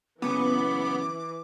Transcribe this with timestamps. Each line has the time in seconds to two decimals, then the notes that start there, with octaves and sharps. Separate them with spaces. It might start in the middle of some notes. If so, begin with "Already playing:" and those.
0.22 F#2 A2 C#3 E3 B3 D6